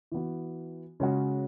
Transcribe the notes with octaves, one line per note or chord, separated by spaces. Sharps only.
E3 B3 F#4
C#3 G#3 C#4 F#4